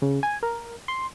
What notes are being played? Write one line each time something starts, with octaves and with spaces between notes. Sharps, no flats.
C#3
G#5
A#4
C6